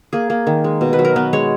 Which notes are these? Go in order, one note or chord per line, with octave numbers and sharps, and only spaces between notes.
A#3 G#4
A#3
D#3
G#3
B2
B4
F#3
A#4
B3 B4
G#3 C#5